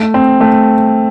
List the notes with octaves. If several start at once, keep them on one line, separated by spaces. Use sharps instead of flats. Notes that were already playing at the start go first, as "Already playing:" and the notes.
Already playing: A3
C4
A3